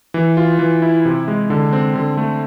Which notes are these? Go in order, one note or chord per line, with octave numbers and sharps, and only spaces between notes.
E3
F4
E3
E4
C3
G#3
D3
C4
D3
A3